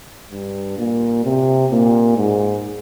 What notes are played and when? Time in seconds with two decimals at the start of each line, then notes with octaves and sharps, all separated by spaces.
0.32 G2
0.78 A#2
1.24 C3
1.72 A#2
2.17 G#2